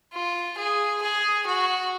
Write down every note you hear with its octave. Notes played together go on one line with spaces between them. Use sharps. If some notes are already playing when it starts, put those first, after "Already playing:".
F4
G#4
G#4
F#4